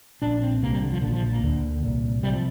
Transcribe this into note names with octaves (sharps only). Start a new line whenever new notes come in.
A#1 A#2 D4
C4
C2 C3 A#3
G3
D3
F3
A#1 A#2 D3
F3
A#3
D2 D3
C2 A#2
C3 G3
F3